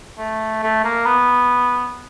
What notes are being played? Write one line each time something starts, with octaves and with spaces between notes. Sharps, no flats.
A3
A3
A#3
B3